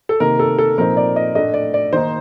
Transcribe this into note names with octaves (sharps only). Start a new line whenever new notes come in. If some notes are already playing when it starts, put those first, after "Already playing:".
A4
C3 D#3 A#3 A#4
A4
A4
A#2 F3 C4 D#4 A#4
D5
D#5
A2 A3 D4 D#5
D5
D5
D#3 A#3 D#4 C5